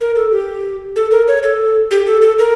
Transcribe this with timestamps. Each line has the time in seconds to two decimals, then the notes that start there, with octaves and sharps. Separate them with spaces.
0.01 A#4
0.15 A4
0.31 G4
0.96 A4
1.11 A#4
1.28 C#5
1.43 A4
1.91 G4
2.07 A4
2.22 A4
2.39 A#4